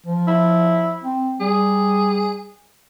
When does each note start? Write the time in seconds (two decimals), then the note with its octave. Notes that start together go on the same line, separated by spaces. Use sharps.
0.06 F3
0.28 E4
1.03 C4
1.40 G3 G#4